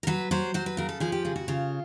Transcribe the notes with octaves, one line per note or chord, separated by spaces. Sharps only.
A#4
F#3 B4
F#3 C5
F#3 C5
B4
C#3 A#4
A4
F3 G#4
G4
C#3 G#4
F#4
C#3 F4